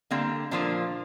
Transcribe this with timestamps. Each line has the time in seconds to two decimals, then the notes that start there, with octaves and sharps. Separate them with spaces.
0.11 D3 G3 A#3 C4
0.51 A#2 F3 A#3 D4